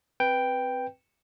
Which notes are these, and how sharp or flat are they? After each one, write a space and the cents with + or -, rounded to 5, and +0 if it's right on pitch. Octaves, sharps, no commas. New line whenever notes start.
C4 +0 B4 +0 G5 +0